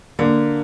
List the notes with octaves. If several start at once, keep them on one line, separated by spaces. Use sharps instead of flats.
D3 A#3